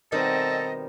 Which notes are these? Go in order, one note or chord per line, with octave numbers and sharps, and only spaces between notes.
B2 D#3 G3 C4 A4 D#5 A#5